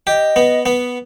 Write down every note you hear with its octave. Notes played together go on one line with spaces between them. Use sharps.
G4 D#5
B3
B3